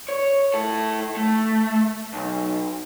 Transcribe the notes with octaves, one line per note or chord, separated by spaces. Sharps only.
C#5
E4 A4
A3
B1